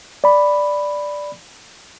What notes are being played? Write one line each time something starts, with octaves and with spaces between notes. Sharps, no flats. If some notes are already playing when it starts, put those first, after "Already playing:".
D5 B5